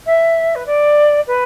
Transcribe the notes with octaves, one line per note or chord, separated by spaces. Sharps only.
E5
B4
D5
B4